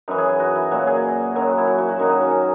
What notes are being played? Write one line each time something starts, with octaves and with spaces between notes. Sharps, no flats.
F#2 E3 D#4
G#4
G#4
F#4
E4
A#2 F#3 F#4
G#4
F#2 D#3 F#3
E4
F#4
F#4
F#4
F#2 D#3 F#3 D#4
D#4
C#4
C#4